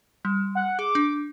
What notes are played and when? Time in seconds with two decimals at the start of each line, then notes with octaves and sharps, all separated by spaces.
0.25 G3
0.55 F#5
0.79 G#4 D6
0.95 D4